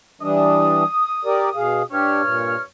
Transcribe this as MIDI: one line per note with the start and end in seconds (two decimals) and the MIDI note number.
0.21 0.84 52
0.21 0.84 55
0.21 0.84 62
0.21 1.84 87
1.25 1.49 67
1.25 1.49 70
1.25 1.49 74
1.56 1.82 47
1.56 1.82 68
1.56 1.82 77
1.91 2.61 43
1.91 2.22 62
1.91 2.22 67
1.91 2.61 73
1.91 2.61 89
2.23 2.56 46